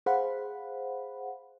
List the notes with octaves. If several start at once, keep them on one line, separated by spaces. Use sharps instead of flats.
G#4 C5 F5 F#5 B5